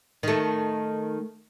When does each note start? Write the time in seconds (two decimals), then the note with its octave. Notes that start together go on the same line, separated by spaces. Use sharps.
0.23 D#3 A3